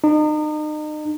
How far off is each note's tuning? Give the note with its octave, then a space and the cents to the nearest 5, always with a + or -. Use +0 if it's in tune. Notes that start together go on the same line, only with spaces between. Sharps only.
D#4 -35